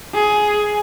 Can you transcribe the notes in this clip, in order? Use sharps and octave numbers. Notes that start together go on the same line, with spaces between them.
G#4